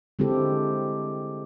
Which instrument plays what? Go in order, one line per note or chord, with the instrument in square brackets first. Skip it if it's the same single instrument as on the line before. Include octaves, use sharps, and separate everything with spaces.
[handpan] D3 G#3 C4 E4 G4 A4